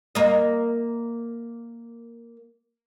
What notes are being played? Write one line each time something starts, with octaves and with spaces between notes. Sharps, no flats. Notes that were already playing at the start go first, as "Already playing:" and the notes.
A#3 D#5